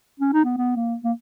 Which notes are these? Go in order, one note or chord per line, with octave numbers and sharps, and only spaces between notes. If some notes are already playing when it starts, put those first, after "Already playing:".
C#4
D#4
B3
B3
A#3
A#3